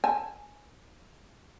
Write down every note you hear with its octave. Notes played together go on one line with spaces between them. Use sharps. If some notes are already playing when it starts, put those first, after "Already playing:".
G#5 A5